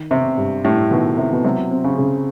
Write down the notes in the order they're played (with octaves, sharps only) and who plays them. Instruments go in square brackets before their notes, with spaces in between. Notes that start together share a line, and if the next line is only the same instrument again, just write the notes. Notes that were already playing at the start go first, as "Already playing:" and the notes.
Already playing: [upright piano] D#3
[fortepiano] C3 [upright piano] B3
[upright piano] G2
[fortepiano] A2 [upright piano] G3
[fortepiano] B2 [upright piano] D#3
[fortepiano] C3 [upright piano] B3
[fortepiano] B2
[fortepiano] C3 [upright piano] F#3
[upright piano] C4
[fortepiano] C#3
[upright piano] C#3